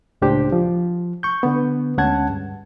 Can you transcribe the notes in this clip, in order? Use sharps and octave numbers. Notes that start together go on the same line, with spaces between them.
C#2 A2 D4 G4 C5
F3
C#6 G6
D3 B3
D2 G#3 C#4 F#5 A5 G#6
G2